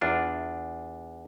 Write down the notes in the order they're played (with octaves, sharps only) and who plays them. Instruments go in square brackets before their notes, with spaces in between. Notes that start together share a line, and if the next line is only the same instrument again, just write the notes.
[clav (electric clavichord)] E2 D4 F4